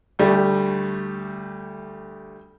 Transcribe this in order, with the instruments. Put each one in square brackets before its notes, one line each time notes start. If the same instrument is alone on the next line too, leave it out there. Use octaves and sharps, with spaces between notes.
[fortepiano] D2 G3 A3